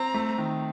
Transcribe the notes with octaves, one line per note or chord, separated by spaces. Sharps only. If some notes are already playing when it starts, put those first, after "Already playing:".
Already playing: C4 A#5
A3
D#3